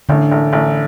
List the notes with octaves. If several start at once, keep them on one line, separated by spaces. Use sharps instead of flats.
A1 D3
A1
A1